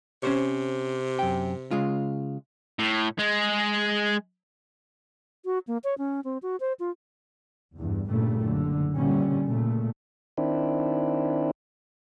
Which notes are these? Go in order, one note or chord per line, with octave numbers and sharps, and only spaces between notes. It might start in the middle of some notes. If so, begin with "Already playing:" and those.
C3 C#4 C5 C#5
F#2 G5
C#3 G#3 F4
A2
G#3
F#4
A#3
C#5
C#4
C4
F#4
C5
F4
E2 G2
G2 A#2 C#3 G3 A3
F#1 D3
A#2 D3 G3 C#4
A#2 C#3 A3
D#3 C4 D4 E4